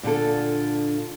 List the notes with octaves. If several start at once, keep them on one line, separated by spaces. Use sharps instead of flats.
A#2 D3 F4 A4